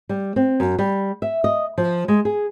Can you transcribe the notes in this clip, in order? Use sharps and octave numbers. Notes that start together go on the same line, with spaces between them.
G3
C4
F#2
G3
E5
D#5
F3
G#3
G#4